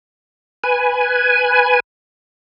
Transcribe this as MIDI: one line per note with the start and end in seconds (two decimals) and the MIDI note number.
0.64 1.80 71
0.64 1.80 80